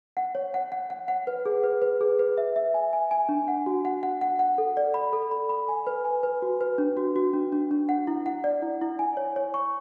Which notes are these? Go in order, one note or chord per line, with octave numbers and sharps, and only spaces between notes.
F#5
C#5
F#5
F#5
F#5
F#5
B4
G#4
B4
B4
G#4
B4
E5
E5
G#5
G#5
G#5
D4
F#5
F#4
F#5
F#5
F#5
F#5
A4
D5
B5
A4
B5
B5
G#5
B4
G#5
B4
F#4
B4
D4
F#4
F#4
D4
D4
D4
F#5
E4
F#5
D5
E4
E4
G#5
C#5
C#5
C#6